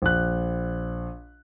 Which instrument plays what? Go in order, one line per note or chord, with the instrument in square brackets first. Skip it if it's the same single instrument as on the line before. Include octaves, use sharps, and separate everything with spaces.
[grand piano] A#1 F#6